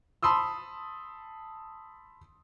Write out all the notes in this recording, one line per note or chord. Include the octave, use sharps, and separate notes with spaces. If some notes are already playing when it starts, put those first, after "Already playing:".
A5 B5 C6 D#6 E6